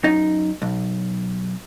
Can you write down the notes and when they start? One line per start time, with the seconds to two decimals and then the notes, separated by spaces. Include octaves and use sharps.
0.03 F#2 D#4
0.62 B1